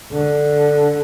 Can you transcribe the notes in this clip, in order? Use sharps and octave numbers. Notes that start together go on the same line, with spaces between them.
D3